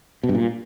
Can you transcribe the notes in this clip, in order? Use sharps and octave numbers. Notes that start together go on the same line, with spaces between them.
B2
G2
A#2